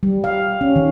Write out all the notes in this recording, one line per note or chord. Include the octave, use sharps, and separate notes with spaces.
G3
F5
C#4
D#3